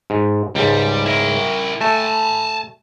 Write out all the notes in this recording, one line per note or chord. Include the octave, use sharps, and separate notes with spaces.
G#2
C#2 G#2 G3
E4 A#4
A3 G#5 A5